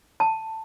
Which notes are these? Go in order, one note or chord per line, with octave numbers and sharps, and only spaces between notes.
A5